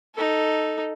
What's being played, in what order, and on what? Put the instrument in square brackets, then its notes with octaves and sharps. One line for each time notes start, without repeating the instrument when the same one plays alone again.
[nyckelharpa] D#4 A4